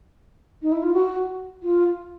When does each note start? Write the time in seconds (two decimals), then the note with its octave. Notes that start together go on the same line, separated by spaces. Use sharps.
0.62 D#4
0.72 E4
0.83 F4
0.94 F#4
1.63 F4